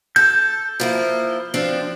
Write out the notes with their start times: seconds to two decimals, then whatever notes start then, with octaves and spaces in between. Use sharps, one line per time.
0.16 A4 G6
0.80 F3 A#3 E4
1.54 F3 C4 D4